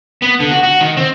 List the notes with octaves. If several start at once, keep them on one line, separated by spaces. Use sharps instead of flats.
B3
D3
F#4
F#4
D#3
C4